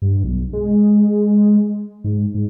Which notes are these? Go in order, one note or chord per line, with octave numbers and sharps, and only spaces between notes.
G2
B1
G#3
G#2
G#2